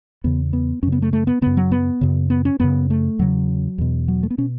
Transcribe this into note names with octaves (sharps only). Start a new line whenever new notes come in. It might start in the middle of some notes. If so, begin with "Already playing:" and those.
E2 C#3 B3
B3
F#2 C#3 C#4
B3
A3
A3
B3
F#2 C#3 B3
F#3
B3
F#2 C#3
B3
C#4
F#2 C#3 B3
A3
E2 C#3 F#3
E2 B2
F#3
A3
B3
B2 C#4